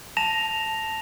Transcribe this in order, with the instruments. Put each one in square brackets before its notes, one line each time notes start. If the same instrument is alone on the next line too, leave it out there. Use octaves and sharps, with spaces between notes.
[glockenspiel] A5 A#6 E7 F7